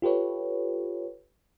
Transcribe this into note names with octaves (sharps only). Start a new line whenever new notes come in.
F4 G4 A4 B4 C#5